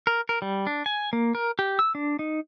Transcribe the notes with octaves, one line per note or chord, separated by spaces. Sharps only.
A#4
A#4
G3
D4
G#5
A#3
A#4
G4
E6
D4
D#4